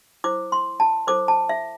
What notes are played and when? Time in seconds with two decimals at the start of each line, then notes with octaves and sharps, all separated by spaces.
0.24 E4 C5 D6
0.52 C6
0.80 A5
1.07 E4 A4 C5 D6
1.28 A5
1.49 E5